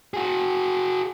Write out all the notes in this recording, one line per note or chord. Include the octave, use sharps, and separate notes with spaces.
F#4 G#4